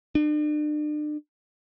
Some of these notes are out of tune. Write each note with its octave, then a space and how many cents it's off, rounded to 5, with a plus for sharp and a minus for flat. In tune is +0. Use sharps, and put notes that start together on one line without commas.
D4 +40